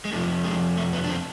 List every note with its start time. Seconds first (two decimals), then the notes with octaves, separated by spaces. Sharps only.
0.05 G#3
0.12 F2 C3 F3 A3
0.44 G#3
0.77 A3
0.93 B3
1.04 D4
1.10 C4